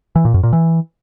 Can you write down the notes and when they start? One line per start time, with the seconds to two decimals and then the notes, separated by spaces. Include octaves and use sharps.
0.16 E3
0.25 A#2
0.34 F#2
0.43 A#2
0.53 E3